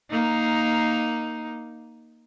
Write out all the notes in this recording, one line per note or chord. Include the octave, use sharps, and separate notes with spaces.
A#3 D#4